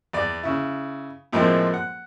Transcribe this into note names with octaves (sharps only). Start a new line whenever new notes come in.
E2 D5
C#3 E4
F2 A2 F3 G#3 A#3 C4
F#5